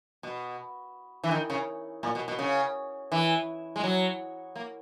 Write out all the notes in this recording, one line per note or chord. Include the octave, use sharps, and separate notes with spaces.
B2
E3
D#3
C#3
A#2
B2
B2
C#3
E3
G#3
F#3
A#3